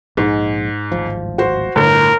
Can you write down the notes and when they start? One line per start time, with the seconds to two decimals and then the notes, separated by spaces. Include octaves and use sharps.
0.17 A#1 G#2 G#3
0.92 D1 G#1 F3
1.38 F#4 C5
1.76 G1 A2 A#4